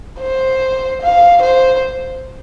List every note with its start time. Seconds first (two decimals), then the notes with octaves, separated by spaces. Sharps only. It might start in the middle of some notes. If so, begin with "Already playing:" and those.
0.19 C5
1.02 F5
1.42 C5